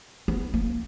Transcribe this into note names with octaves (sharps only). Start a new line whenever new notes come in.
B3
A#3